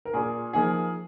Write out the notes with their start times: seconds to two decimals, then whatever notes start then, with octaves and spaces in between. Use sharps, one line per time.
0.05 A#4
0.14 A#2 G#4
0.53 F3 A#3 D#4 G#4